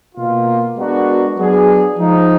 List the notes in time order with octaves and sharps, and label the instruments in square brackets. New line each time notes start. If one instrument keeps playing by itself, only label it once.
[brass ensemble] B2 A#3 F4
G#3 B3 D4 F#4 A#4
F#3 B3 D4 G#4
F3 G#3 D#4